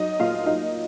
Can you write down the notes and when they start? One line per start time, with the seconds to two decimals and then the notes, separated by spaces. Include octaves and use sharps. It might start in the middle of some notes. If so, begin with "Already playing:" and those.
Already playing: F#3 D#4 D#5
0.20 A#2 F4 F5
0.46 F#3 D#4 D#5